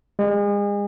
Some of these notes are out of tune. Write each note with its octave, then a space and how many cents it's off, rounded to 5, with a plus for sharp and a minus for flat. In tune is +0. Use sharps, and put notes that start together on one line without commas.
G#3 -35